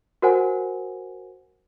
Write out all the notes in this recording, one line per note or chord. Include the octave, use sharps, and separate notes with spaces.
F#4 A#4 C5 F#5 G#5